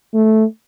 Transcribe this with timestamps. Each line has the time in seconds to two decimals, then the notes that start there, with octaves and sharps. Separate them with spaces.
0.14 A3